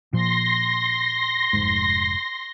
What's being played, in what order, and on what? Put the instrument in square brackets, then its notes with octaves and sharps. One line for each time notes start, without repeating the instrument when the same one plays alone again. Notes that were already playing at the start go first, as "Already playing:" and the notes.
[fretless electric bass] A#2 F3 [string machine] C6 A#6
[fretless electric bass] F1 G#2